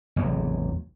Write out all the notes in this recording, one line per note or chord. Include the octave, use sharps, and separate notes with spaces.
A1 E2 C3 F#3